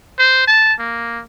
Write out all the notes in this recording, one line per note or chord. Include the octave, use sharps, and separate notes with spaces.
C5
A5
A#3